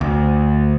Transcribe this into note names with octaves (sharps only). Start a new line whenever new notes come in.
D2